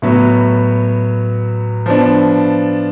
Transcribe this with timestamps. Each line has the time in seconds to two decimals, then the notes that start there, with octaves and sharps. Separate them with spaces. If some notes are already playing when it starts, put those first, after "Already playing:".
0.02 A2 F#3 B3 F#4
1.86 F3 B3 D4